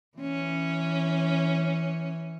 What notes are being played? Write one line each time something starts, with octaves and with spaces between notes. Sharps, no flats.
E3 C#4